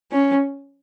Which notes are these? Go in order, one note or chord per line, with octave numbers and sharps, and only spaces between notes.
C#4